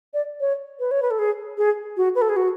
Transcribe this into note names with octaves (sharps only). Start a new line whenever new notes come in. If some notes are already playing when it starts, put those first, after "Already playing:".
D5
C#5
B4
C#5
B4
A4
G#4
G#4
F#4
B4
A4
G#4
F#4